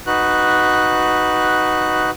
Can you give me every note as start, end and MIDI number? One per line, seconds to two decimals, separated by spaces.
0.07 2.10 63
0.07 2.10 66
0.07 2.10 71
0.07 2.10 90